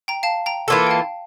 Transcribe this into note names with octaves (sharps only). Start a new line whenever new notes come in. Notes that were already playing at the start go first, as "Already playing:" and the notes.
G5 A#5
F5 A5
G5 A#5
E3 A#3 F4 A4
G5
F5 A5